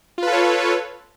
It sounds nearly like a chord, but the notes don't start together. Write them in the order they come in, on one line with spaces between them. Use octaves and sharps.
F4 B4 A4 C#5